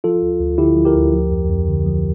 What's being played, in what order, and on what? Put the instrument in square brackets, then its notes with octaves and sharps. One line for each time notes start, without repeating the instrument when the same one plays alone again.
[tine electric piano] F3 F4 A4
D2
D2
D3 E4 G4
F3
G4 A#4
D2
F3
F2
F2
D3
F3